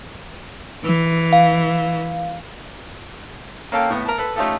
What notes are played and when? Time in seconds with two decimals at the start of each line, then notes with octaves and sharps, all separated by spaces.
0.84 E3
1.33 F5
3.72 A#3 C#4 A4 F5 G5
3.90 A2 B3
4.06 A#4 A5
4.18 A4 B4
4.36 A3 C#4 D#4 F4 G4 A4